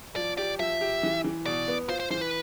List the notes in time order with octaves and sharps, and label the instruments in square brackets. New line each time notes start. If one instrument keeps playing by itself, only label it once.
[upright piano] F3 [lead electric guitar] D5
[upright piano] G4 [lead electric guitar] D5
[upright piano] F3 [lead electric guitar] E5
[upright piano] G4
E3
E3
[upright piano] B2 [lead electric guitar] D5
[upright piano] B3
[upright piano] F4 [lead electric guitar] C5
[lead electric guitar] C5
[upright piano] E3 [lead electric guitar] C5
[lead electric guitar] B4